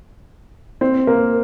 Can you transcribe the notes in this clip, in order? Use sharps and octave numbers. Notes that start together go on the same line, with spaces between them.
C4
A#3